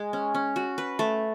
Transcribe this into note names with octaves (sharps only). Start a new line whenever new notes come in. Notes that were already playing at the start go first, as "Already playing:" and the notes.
Already playing: G#3
C#4
C#4
F#4
B4
A3